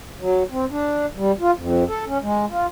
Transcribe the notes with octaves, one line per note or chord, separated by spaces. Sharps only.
F#3
C4
D4
G3
F4
F2
A4
C#4
G#3
F4